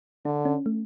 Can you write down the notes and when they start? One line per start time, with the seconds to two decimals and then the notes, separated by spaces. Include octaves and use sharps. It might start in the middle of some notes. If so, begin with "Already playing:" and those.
0.25 D3 D4
0.45 C#4
0.66 A3